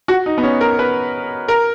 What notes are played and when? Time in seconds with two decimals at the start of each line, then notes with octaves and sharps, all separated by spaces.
0.08 F#4
0.26 D#4
0.38 B3
0.43 C#4
0.61 A#4
0.79 B4
1.48 A#4